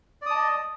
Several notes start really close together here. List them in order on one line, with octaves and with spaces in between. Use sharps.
D5 D#6 A5 D#5